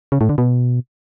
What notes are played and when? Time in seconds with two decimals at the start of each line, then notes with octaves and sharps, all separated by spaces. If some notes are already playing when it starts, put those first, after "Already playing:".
0.12 C#3
0.21 A2
0.29 D3
0.38 B2